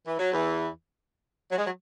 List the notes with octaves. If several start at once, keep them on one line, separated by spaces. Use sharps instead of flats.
E3
F#3
E2 E3
F#3
G#3
F#3